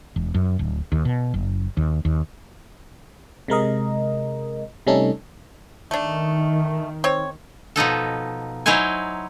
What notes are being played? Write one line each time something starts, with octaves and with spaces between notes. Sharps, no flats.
E1
F#2
D1
D#2
B2
F#1
D#2
D#2
C3 G#3 A#4 D#5
C3 G3 A3 C#4 D#4 A4
D#3 A3 D4
C4 C#5
B2 F3 D#4 A4
F#3 D#4 E4 C5 G#5